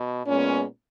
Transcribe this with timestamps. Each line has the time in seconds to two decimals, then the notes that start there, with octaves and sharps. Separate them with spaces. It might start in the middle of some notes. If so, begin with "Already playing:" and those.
Already playing: B2
0.27 A#2 G#3 B3 C#4